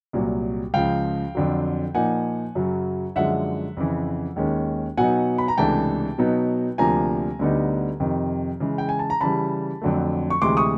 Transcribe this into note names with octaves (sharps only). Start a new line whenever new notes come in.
C2 A#2 F#3
C#2 C#3 F3 F5 G5
F2 D3 F#3
A#2 F3 A#3 D#4 F#5 G#5
F#2 C#3 F#3
F#2 D3 F3 G#3 E5 F#5
F2 C#3 E3
D#2 D#3 G#3 C#4
B2 F#3 B3 D#4 F#5 G#5
B5
A#5
C#2 C3 E3 A3 D4 G5 A5
B2 F#3 B3 D#4
D2 C3 F3 A#3 D4 G#5 A#5
D2 D3 G3 B3 D#4
F2 C3 D#3
C#3 E3 G#3
G5
G#5
A5
A#5
C#3 E3 G3 A5 B5
F2 D3 F#3 A3
C#6
D2 C3 E3 G#3 C6 D6
C#6 D#6